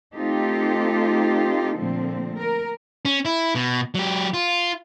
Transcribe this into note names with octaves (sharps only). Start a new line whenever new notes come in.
A3 C4 D#4 F4 G4 A4
A#2 D3 F3 A3 C4
A#4
C#4
E4
B2
F#3 G4
F4